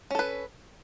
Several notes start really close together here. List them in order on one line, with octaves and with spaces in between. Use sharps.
C#4 A4 B4